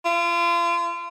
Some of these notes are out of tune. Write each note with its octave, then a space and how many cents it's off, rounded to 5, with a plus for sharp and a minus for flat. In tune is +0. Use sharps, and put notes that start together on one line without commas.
F4 -35